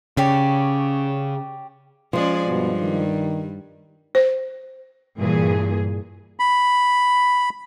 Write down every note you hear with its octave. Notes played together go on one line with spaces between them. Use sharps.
C#3 G4 C#5 D5
F3 G#3 C#4 G#4 D5
G2 B2 G3
D#3
C5
G2 A#2 E3 G#4
B5